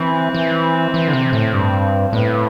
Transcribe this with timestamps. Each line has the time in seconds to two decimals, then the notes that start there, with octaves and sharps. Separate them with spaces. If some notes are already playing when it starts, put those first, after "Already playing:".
Already playing: E3 C4
0.34 E3
0.94 E3
1.08 D3
1.13 C3
1.33 A2
1.53 G2
2.12 A2 B3